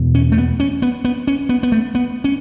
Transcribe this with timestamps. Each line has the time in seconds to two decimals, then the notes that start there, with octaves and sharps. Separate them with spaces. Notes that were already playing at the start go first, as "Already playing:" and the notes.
Already playing: E2 B2
0.15 C#4
0.32 A3
0.38 B3
0.60 C#4
0.82 B3
1.05 B3
1.27 C#4
1.49 B3
1.63 B3
1.72 A3
1.95 B3
2.24 C#4